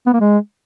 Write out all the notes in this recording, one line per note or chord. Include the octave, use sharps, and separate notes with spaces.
B3
A#3
G#3